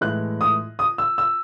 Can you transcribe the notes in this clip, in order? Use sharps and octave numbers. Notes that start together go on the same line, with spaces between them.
A2 E3 G#3 F#6
D#6
D#6
E6
E6